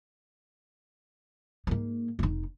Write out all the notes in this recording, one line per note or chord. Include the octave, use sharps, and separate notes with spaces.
G#2 A#3
F1 D#4